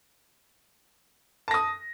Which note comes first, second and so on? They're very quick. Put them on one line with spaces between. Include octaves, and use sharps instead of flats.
A5 A#6 D#6